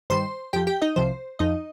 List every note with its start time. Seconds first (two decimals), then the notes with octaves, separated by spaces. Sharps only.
0.10 G2 D#3 G3 C5 C6
0.53 F2 F3 G4 G5
0.67 G4 G5
0.82 D#4 D#5
0.96 C2 C3 F3 C5
1.39 F2 F3 D#4 D#5